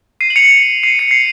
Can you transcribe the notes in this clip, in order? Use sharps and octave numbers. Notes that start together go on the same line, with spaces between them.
C7 D#7
F#7
C#7 F7
C7 D#7
C#7
C7